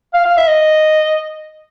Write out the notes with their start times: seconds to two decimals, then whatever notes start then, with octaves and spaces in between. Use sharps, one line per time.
0.14 F5
0.25 F5
0.37 E5
0.48 D#5